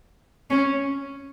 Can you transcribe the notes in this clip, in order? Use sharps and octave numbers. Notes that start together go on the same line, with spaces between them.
C#4